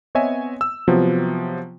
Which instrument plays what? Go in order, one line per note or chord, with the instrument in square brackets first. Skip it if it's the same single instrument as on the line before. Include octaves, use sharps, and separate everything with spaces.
[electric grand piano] B3 C4 C#5 D#5 E5 G#5
E6
C3 F3 F#3 B3